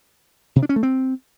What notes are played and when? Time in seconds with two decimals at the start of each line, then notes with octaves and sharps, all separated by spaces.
0.56 C3
0.63 D4
0.69 C#4
0.76 A3
0.83 C4